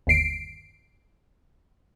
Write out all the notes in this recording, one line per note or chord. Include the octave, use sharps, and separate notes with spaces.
G1 D#2 C7 D7